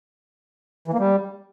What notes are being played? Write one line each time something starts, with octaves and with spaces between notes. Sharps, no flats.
E3
A#3
G3